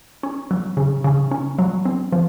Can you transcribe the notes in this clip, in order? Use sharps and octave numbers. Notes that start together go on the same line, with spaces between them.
C#4
F#3
C#3
C#3
C#4
F#3
C4
F3